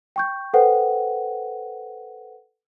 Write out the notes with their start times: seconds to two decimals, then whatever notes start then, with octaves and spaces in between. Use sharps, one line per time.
0.16 G5 C#6 G6
0.53 A4 B4 C5 F#5 G5